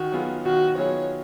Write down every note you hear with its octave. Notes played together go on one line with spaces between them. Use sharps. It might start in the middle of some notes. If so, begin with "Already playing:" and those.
Already playing: D#3 F#4
F#3 B3 F4 G#4
D#3 F#4
F#3 B3 F4 G#4 C#5